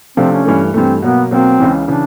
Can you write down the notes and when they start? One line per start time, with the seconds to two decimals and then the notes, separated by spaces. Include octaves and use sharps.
0.17 C3 F3 A3 C4 D4 F4
0.32 C#4
0.45 G2 E3 A3
0.74 G2 E3 A3 C4
1.02 B2 F#3 A#3 B3
1.31 B2 F#3 A#3 C4
1.59 C#2 C#3 E3
1.88 C#3 E3 D4